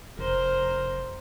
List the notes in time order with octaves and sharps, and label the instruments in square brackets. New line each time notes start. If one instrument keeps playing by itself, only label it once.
[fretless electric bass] F1 [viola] A#4 C5